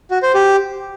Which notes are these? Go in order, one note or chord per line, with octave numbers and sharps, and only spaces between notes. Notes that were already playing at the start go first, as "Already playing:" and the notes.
F#4
C5
G4